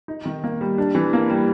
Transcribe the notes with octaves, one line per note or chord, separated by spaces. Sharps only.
D#4
D#3
A#3
G3
D4
E3
A#3
G3